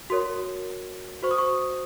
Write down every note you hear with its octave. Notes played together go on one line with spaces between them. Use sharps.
F#4 A#4 C#5 C6
F#4 C5 C#6
D#6
C#6